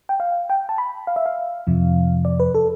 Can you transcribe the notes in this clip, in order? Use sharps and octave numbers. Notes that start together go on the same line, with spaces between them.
G5
F5
G5
A5
B5
F5
E5
F5
F2 C3 F3
D5
B4
A4